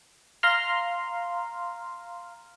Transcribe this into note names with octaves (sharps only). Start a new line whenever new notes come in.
F5 A#5 C6 F6